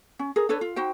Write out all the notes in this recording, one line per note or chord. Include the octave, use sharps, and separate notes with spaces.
C#4
G#4 A#4
D4 A4 B4 C#5
F4
D#4 F#4 C5 G5